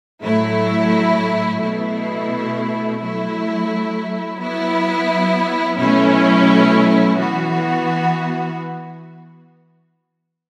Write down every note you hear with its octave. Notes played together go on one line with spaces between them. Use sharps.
A2 F#3 A3 E4
B2 A3 E4
F#3 A3 E4
F#3 B3 E4
B2 F#3 A3 C#4 E4
E3 B3 F#4